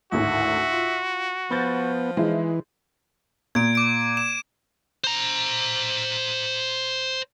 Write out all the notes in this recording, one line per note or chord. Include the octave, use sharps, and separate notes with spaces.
G#1 D2 A2 F#4 E5
F4
F3 B3 B5 G6 A6
E3 G#3 D#4 E4
A#2 G#6 D7
D6 D7
E7
C5 A#5